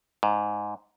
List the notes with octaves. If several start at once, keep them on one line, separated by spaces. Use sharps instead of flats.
G#2